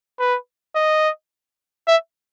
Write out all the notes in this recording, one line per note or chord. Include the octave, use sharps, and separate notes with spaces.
B4
D#5
E5